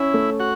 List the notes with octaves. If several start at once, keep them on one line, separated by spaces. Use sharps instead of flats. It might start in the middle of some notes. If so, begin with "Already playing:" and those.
Already playing: C#4 E4
A3
F#4